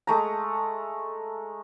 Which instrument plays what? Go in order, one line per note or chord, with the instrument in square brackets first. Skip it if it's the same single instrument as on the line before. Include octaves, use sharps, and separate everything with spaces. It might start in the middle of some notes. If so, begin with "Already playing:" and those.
[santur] G#3 A3 A#5